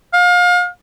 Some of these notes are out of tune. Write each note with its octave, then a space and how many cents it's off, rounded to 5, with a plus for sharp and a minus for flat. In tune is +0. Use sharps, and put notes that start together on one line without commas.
F5 +35